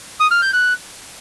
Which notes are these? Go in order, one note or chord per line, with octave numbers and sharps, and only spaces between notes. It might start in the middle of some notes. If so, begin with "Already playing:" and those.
D#6
F6
G6
F#6